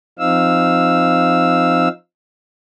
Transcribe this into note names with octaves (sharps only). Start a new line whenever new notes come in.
F3 C4 D#4 F5 E6